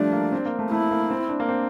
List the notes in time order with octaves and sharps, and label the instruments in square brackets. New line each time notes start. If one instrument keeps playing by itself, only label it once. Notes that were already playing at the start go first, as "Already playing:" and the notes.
Already playing: [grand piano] F3 G3 A3 [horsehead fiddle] D4
[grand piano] A#3
C4
A#3
A3
[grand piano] A3 [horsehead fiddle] E4
[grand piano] A#3
C4
D4
A#3
C4